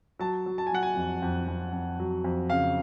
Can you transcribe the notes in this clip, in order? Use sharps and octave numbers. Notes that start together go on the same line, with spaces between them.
F#3 A5
F#3
A5
G#5
F#3 F#5
G#5
F2
F2
F2
F2
F#3
F2
C#3 F5